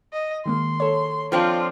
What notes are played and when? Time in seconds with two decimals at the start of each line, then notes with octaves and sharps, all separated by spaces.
0.13 D#5
0.46 D#3 G#3 A#3 C6
0.80 A4 C#5
1.32 F3 C4 D4 F4